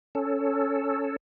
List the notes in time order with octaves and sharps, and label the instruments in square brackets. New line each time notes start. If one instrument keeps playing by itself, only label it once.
[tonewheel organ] C#4 A4